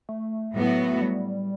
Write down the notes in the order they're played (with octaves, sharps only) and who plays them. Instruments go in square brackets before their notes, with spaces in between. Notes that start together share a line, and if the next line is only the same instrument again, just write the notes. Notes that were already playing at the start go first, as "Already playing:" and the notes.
[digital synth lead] A3
[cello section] A2 F#3 B3 F#4
[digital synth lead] A3
G3